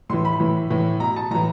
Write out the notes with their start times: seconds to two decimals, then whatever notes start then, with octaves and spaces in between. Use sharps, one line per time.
0.09 A2 E3 C6
0.25 B5
0.40 A2 E3
0.70 A2 E3
1.00 B2 A#5
1.16 A5
1.31 A2 E3 A#5